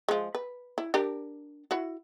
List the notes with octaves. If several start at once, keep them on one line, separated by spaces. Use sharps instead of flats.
F3 G#3
B4
E4
D4 G4 A#4
E4 F#4